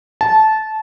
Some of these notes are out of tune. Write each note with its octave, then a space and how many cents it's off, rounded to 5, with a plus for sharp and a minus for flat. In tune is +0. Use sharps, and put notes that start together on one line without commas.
A5 -15